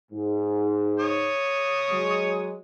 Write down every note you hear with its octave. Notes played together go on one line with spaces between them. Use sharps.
G#2
C#5 D#6
F#3 G#3